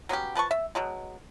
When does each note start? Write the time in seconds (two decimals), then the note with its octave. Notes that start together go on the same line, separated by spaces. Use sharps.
0.09 F#3 B3 C#4 G4
0.35 F3 B4 A5 C#6
0.51 E5
0.75 B2 F#3 G#3